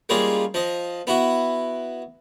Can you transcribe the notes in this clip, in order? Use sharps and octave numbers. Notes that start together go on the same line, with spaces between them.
G3 G#3 A#3 C#4 F4 G#4
F3 D#5
B3 E4 F#4